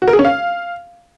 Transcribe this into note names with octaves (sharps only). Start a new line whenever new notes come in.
F#4
A#4
G#4
C#4
F5